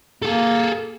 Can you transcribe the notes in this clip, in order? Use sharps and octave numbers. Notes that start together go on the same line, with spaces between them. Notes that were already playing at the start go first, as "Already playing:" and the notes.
A#3 G#4 A4